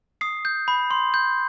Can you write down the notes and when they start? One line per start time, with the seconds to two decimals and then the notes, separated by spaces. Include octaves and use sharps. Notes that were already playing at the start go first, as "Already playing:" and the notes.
0.21 D#6 C7
0.45 G6
0.68 B5
0.91 C6
1.14 G6